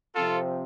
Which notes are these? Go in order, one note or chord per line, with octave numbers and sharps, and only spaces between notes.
C3 F3 C4 F4 A4